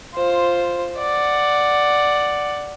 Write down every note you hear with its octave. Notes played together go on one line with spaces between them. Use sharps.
F4 C5
D5 F#5